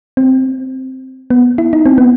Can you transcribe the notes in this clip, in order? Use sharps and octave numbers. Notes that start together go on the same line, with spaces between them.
C4
B3
E4
D#4
C4
B3